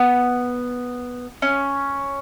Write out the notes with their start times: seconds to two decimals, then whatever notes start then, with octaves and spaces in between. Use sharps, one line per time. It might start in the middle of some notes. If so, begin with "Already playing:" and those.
Already playing: B3
1.42 C#4